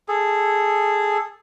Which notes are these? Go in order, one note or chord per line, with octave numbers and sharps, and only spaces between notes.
G#4 A4